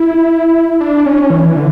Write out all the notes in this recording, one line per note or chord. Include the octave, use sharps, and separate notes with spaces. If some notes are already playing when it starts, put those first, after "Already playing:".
Already playing: E4
D4
C#4
E3
E3
D3